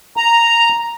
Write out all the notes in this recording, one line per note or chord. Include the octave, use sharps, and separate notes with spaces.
A#5